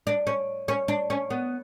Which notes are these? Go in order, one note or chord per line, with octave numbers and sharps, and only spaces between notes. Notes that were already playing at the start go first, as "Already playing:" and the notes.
D4
C#4
C#4
D4
C#4
B3